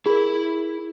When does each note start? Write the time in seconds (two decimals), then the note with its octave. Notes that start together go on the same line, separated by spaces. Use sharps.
0.06 E4 G#4 A#4 B5